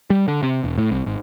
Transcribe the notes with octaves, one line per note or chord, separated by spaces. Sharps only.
G3
D3
C3
E1
A2
C2
G#1